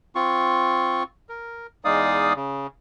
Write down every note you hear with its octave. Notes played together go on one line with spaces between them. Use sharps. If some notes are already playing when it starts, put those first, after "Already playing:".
C4 F4 C#6
A#4
E2 G#3 D#4 D5 F5 D#6
C#3